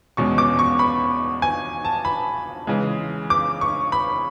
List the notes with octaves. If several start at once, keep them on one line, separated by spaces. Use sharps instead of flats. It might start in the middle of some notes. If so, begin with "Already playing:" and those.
E2 B2 G#3 C#4 C#6
D6
C#6
B5
G#5
A5
B5
C#3 E3 G#3
D6
C#6
B5